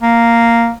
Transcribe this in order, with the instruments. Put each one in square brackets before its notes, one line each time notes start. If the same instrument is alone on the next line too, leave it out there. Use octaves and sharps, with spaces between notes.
[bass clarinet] A#3